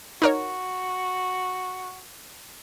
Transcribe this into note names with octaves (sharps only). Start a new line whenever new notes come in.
D#4 F#4 A#4 C#5